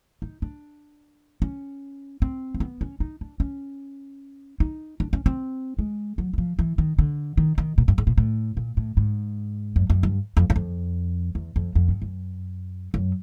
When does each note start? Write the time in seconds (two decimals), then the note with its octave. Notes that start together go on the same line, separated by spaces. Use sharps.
0.22 D#4
0.42 D4
1.42 C#4
2.22 C4
2.55 A#3
2.60 B3
2.81 C#4
3.00 D#4
3.21 D4
3.40 C#4
4.60 D#4
5.00 D4
5.13 C#4
5.26 C4
5.79 G#3
6.18 F#3
6.34 E3
6.38 F3
6.59 E3
6.78 D#3
6.99 D3
7.37 D#3
7.58 D#3
7.78 A#2
7.88 G2
7.98 G#2
8.07 A#2
8.18 A2
8.57 A#2
8.77 A2
8.97 G#2
9.76 F#2
9.90 F#2
10.03 G2
10.37 F2
10.50 F#2
10.56 F2
11.35 E2
11.56 F2
11.75 F2
11.88 G2
12.02 F#2
12.94 F#2